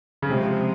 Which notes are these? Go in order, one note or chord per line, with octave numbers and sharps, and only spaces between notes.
C#3
C3 F3 G#3 C4